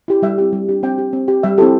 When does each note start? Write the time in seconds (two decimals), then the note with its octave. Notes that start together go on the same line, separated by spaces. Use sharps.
0.08 E4 G4
0.22 G3 E5
0.38 C4 E4 G4
0.53 G3
0.69 D4 G4
0.83 C4 G5
0.98 G4
1.13 C4
1.28 G4
1.43 G3 E5
1.58 C4 E4 G4 A4